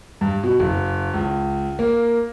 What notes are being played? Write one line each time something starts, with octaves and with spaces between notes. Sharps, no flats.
G2
B2
F#1
C#2
A#3